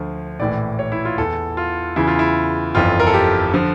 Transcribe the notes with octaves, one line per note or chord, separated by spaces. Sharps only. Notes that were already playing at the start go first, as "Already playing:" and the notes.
Already playing: D2 D3 F3
A#1 A2 E3 D5
C#5
E4
F4
E2 E3 A4
F4
E2 C#3 E3 E4
F4
E4
G1 F2 E3 F4
A#4
A4
G4
D3 F3